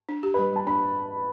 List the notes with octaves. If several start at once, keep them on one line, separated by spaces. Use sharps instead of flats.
D4
G4
B4
G3
G3 A5
D4 B5